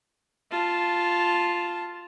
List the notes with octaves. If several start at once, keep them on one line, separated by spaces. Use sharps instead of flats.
F4 A5